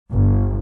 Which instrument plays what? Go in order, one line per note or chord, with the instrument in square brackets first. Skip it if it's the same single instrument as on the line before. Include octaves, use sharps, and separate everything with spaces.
[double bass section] G1